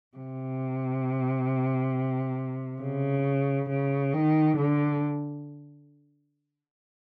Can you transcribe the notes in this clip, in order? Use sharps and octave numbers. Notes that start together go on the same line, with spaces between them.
C3
C#3
C#3
D#3
D3